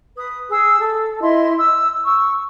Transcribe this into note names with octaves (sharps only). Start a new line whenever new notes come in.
B4 D#6
G#4 E6
A4
E4 D#5 C6
E6
C#6 E6